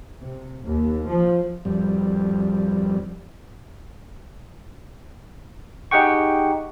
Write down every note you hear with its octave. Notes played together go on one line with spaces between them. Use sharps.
C3
D#2
F3
F2 G3
D#4 G4 G#4 F#5 G5 C#6